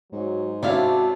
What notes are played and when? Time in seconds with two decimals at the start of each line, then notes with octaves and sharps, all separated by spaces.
0.12 G#2 F#3
0.63 C3 C#4 D4 E4 F#4 F5